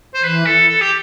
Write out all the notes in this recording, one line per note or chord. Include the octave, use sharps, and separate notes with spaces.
C5
E3 B4
A4
A4
G4